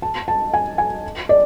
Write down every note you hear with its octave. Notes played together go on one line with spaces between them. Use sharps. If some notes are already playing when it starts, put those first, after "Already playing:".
A5
A5
G#5
G#5
D5